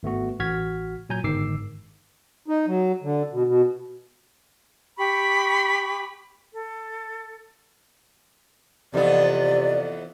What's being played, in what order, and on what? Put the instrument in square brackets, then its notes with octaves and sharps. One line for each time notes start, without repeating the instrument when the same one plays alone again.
[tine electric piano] G#1 A3 B3 F#4
A1 F#4 F6 G#6 B6
A#2 F#3 G#5 A#5 G6
G1 G#2 D#3 D6 E6 C7
[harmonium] D#4
F#3
D3
B2
B2
[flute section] G4 B5 C#6
A4
[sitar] F2 E3 B3 [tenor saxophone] C3 [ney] D5